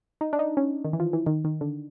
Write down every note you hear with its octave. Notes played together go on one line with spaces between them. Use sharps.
D#4
D4
D#4
C#4
D#3
E3
F3
E3
D#3
D#3
D3